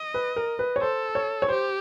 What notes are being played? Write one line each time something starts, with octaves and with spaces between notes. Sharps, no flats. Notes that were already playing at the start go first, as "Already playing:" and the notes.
Already playing: D#5
B4
A#4
B4
C#5
A4 C5
C#5
C#5
G4 C5